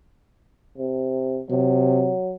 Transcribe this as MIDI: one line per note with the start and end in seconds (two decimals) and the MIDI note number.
0.78 1.41 48
1.50 2.14 48
1.50 2.34 54